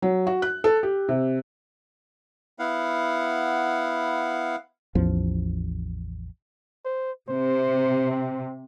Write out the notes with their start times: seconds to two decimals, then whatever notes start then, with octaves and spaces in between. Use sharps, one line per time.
0.02 F#3
0.27 F#4
0.42 F#6
0.64 A4
0.83 G4
1.09 C3
2.59 B3 E4 F5 F#5
4.95 A1 E2 F3
6.85 C5
7.29 C3 C5
8.11 C4